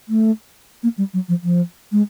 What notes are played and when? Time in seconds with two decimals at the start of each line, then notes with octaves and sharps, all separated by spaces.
0.09 A3
0.83 A#3
0.98 G3
1.14 F#3
1.28 F3
1.43 F3
1.92 G#3